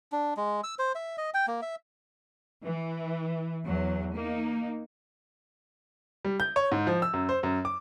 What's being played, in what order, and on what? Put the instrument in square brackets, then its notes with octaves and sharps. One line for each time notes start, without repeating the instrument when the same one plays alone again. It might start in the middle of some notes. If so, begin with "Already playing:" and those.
[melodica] D4
G#3
E6
C5
E5
D#5
G5
A#3
E5
[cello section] E3
E2 F#3
A#3 D#4
[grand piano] G3
G6
C#5
G#2
F3
E6
F#2
C5
F#2
D6